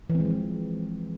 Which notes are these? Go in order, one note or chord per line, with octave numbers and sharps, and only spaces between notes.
E3
C4
G#3
F3
E3